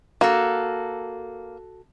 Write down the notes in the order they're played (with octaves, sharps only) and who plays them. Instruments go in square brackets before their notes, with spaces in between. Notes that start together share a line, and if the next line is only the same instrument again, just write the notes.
[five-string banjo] A#3 [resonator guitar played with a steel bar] F#4 A4